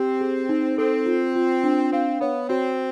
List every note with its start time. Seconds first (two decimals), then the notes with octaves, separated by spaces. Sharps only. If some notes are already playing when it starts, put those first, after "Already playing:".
Already playing: C4 G4
0.21 G#4
0.49 D#4
0.78 C4 A4
1.06 F4
1.35 F4
1.64 D4
1.92 C4 F5
2.21 B3 C#5
2.49 C4 F#4